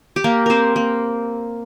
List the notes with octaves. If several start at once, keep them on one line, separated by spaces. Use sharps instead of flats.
G4
A#3 A#4
C4 A#4 C5
A#3